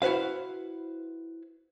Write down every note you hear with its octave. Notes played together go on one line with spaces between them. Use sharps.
E4 F#4 B4 C5 F5